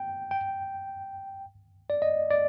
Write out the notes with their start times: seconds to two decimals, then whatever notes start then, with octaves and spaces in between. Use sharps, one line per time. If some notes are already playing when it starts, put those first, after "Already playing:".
Already playing: G5
0.31 G5
1.90 D5
2.02 D#5
2.31 D5